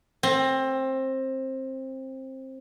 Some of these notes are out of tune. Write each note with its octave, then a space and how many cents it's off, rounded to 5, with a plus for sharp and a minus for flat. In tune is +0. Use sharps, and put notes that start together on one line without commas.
C4 +20